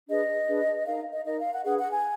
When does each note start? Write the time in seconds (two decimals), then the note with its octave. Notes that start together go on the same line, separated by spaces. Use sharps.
0.08 D4 G#4 B4 D#5
0.47 D4 G#4 B4
0.86 D#4 A#4 F5
1.12 D#5
1.25 D#4 A#4 D#5
1.39 F5
1.52 F#5
1.65 D4 G#4 B4 F#5
1.78 F#5
1.91 G#5